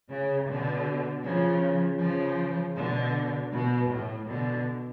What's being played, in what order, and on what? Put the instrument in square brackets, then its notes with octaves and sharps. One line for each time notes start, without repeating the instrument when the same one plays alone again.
[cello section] C#3
B2 D3
C#3 F3
C#3 F3
B2 D3
B2
A2
B2 D3